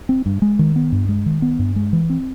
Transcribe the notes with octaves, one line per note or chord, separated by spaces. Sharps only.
C4
G2
G#3
D#3
B3
G2
G#3
D#3
B3
G2
G#3
E3
C4